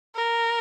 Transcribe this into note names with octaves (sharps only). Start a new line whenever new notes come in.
A#4